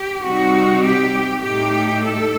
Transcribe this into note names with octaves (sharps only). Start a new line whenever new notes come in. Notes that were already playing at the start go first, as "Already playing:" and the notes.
Already playing: G4
C3 G3 C4 D#4 F#4
G4
A2 A3 D#4 G4
A4